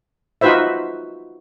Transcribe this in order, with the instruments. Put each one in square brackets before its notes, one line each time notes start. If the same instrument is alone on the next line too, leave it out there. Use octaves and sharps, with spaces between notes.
[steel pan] D#4 F4 F#4 B4 C5 E5